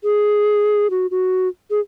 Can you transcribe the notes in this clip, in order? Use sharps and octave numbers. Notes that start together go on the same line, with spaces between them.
G#4
F#4
F#4
G#4